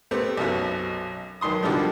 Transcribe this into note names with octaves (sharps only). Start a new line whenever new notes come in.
A3 B3 C4 G4
B1 F#2 B2
B1 D#3 C6 D#6
B2 D3 D#3 F3 G3